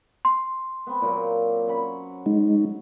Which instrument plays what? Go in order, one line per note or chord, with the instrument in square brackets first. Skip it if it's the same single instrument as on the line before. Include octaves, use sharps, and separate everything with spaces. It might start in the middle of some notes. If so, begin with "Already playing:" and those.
[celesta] C6
[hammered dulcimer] B3 C4
A#2 F#3 A#3
C#4 F#5 B5
[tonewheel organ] G#3 D#4